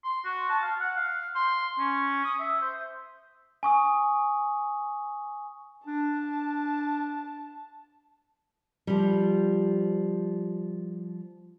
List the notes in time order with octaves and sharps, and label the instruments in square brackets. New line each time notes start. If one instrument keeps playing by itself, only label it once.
[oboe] C6
F#4
A5
F5
F#5
F5
C6
C#4
D#6
E5
C5
[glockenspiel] G#5 C#6 D#6
[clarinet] D4 [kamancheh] A5
[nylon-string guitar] F3 G3